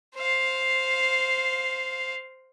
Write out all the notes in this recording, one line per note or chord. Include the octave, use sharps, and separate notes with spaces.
C5 F5